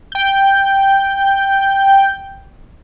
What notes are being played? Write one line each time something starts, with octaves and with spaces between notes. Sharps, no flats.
G5 G6